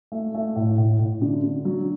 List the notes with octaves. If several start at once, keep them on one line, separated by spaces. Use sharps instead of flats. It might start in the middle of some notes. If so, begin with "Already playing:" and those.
A3
A3
A2
A2
A2
D3
D3
F#3